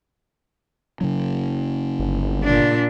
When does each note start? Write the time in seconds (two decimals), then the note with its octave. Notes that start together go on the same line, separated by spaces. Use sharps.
1.01 F#1 C#3 F#3
1.99 G1
2.43 A#2 D4